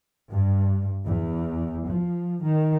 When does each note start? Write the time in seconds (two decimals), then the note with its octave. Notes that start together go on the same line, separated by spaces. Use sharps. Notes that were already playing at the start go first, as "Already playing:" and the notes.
0.31 G2
1.04 E2
1.87 F3
2.41 D#3